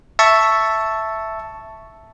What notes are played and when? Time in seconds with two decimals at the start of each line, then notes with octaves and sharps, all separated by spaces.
0.19 E5 A5 C#6